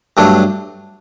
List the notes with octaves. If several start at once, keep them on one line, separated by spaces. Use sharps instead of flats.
G2 F#3 A3 D4